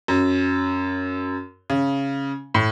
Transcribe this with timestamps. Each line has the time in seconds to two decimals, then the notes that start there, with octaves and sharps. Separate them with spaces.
0.08 F#2
1.70 C#3
2.55 A2